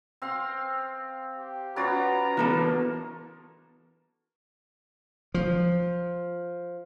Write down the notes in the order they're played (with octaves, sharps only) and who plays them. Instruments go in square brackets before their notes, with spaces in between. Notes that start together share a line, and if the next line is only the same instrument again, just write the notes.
[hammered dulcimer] C4 F5 C6
[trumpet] G4
[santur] B3 F#4 D5 [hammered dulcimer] C#4 F4 B4 [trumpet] A#5
[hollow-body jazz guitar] E3 B3 A4 [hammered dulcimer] A#3 [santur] D4 A#4
[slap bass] F3